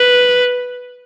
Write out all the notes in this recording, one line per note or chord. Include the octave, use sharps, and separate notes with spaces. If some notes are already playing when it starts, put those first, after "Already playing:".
Already playing: B4